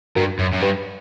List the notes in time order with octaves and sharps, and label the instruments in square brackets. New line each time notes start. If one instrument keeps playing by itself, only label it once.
[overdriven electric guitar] G2 [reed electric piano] F#4 A#4
[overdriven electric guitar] F#2
F#2
[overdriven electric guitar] G2 [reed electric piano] G4 B4